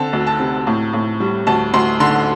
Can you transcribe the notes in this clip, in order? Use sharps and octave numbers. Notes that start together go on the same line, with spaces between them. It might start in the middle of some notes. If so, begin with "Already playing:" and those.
Already playing: D3 C4 A5
D2
A5
C3
A2
A2
G3
D2 A5
D2 C6
D3 C6